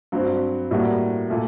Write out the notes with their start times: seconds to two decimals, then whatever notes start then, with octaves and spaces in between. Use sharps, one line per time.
0.12 G2 F#3 C4
0.71 A2 G3 A#3 F#4
1.30 A#2 A3